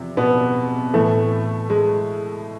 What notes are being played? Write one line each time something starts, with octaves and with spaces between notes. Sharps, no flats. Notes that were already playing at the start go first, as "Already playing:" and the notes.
Already playing: E2 C3 F3 C4
B2 B3
A2 E3 A3
G#3